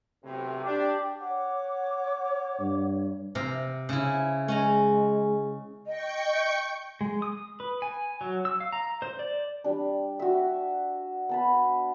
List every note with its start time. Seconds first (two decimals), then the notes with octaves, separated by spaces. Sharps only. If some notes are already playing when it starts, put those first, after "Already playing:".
0.23 B1 A2 C3
0.64 D4 G4
1.20 C#5 F#5 D6
2.60 G2
3.35 C3 F5 A#5
3.89 C#3 E4
4.48 G#3 C#4 G#5 A#5
5.87 D#5 G5 C#6 G6
7.01 G#3
7.22 D#6
7.60 B4
7.82 G#5
8.21 F#3
8.45 E6
8.60 F5
8.73 A#5
9.02 C5
9.19 D5
9.64 G3 D4
10.19 F#4 E5
11.29 B3 A5 B5